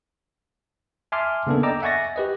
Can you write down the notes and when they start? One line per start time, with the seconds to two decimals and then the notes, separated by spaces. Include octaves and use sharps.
1.12 E5 G#5 A5 C6 D6 F6
1.47 C#3 A#3 B3 D4 A4
1.63 D5 D#5 G5 A#5 D6 E6
1.82 E5 F#5 G#5 C#6 A6 A#6
2.16 G4 B4 D#5